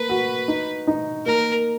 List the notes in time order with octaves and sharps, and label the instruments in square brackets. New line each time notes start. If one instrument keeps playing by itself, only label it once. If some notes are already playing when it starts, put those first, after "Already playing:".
Already playing: [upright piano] A#3 [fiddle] B4
[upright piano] F#4
D#4
D#4
[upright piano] A#3 [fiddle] A#4